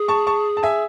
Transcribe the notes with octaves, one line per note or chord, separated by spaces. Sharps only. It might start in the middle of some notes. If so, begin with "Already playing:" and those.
Already playing: G#4
A5 C#6
A5 C#6
A5
E5 G#5